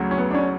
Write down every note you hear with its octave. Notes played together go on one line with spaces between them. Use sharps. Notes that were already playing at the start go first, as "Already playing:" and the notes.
Already playing: D2 C#3 F#3
C#4
B3
D4
C#4